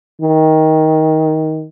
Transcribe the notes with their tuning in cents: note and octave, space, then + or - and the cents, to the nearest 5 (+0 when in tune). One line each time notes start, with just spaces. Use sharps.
D#3 +15